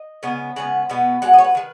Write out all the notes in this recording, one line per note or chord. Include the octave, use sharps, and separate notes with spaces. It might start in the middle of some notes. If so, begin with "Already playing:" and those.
Already playing: D#5
C#3 G#3 B3
C#3 G#3 B3 F#5
B2 G#3 B3
B2 G#3 F#5
D#5
C#5
B4
D#3 G#3